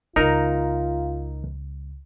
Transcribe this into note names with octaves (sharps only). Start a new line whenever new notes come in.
C#2 D#4 F4 A#4